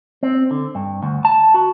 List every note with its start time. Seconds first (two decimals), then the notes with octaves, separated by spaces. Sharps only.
0.23 C4
0.51 D3
0.75 G2
1.03 D2
1.25 A5
1.54 F#4